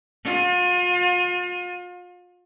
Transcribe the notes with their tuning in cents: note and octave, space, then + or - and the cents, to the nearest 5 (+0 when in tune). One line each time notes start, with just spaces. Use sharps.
F4 +40